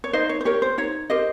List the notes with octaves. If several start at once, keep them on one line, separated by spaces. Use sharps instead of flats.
C#5
D#4 C5 D#5
C#5
C5
G4 A#4 C#5
C5
D#4 C#5
G4 A#4 C5 D#5